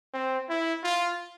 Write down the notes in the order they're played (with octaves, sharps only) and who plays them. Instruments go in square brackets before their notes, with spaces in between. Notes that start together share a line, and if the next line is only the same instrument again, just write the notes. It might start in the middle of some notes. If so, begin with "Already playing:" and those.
[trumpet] C4
E4
F4